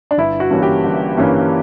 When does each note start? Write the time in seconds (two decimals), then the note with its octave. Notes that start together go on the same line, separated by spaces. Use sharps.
0.11 D4
0.18 G1 E4
0.40 F#4
0.51 G2 E3 A#3 C#4
0.63 G4
0.84 G1
1.17 G2 E3 A#3 C#4